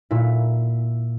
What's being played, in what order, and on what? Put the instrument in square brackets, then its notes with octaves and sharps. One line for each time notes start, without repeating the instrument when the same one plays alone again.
[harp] A#2 E4